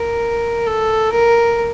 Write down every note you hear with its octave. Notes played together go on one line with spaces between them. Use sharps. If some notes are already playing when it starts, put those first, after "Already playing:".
Already playing: A#4
A4
A#4